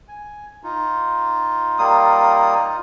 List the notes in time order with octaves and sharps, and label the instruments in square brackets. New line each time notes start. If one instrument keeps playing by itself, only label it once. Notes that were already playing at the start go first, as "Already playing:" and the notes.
[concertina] G#5
D#4 F4
[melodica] G3 A#3 D#6